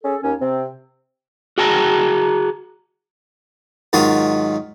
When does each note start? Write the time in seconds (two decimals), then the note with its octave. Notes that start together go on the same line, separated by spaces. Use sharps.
0.04 C#4 G#4 A4
0.23 D#2 C#4
0.40 C3 C4
1.58 F#4 G#4 G5 A5 A#5
3.93 G#2 D#3 F#3 F4 D#6